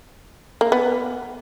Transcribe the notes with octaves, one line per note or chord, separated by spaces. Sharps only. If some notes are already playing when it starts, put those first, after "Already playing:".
A#3
B3